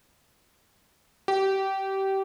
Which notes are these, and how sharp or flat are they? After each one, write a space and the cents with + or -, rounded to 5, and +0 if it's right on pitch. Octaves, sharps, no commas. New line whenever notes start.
G4 -25